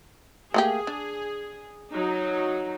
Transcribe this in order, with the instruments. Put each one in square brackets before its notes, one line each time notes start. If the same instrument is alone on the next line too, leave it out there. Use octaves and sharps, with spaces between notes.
[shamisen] A3 A#3 G4 [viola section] G#4
[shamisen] D4
[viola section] F#3 D#4